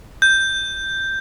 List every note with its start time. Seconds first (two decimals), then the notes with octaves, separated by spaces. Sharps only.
0.22 G6